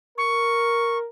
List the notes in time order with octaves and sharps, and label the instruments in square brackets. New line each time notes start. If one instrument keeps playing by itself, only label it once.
[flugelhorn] A#4 [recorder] C#6